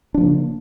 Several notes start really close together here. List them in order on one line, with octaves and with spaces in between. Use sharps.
D4 F3 A#3 C#3